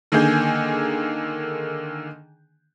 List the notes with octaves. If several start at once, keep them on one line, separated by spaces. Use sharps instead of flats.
D3 D#3 A#3 G#4 G#5 G6